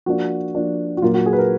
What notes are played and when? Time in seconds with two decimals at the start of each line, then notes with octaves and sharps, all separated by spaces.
0.06 F3 A#3 D4 F#4
0.55 F3 A#3 D4
0.97 F#4
1.02 A#2 F#3 A#3 F4
1.14 F#4
1.26 G#4
1.33 B4
1.39 A#4